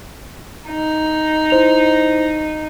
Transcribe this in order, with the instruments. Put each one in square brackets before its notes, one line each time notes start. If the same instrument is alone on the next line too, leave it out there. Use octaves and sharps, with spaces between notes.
[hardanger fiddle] D#4
[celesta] E4 C5 F7